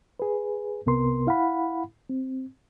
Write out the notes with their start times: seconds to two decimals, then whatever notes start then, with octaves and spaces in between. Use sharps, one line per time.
0.20 G#4 B4
0.86 C2 C3 B3 A#4 C6
1.27 E4 F5 F#5 B5
2.09 C4